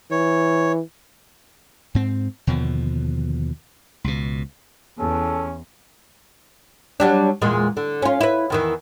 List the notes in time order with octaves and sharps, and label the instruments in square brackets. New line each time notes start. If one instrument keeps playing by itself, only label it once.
[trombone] E3 [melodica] C#5
[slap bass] G#2 C4
D#2 B2 D3 F3
C#2 B2
[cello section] E2 [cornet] C#4 [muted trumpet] A4
[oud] F#3 G3 D4
E2 A#2 G#3
D3
C#4 F4
E4 B4
E2 D#3 E3